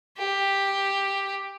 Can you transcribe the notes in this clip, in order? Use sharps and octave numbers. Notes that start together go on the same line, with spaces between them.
G4